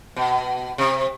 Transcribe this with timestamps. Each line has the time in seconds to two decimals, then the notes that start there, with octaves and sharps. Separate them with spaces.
0.16 B2
0.78 C3